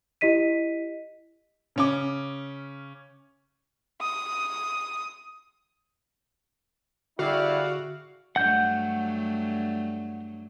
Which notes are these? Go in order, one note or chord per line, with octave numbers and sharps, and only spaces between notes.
E4 G4 D#5 B6 D#7
C#3 C#4 D6
D#6
D3 G3 E4 F#4 G#4 D5 F5
G2 F#3 A3 F#5 G6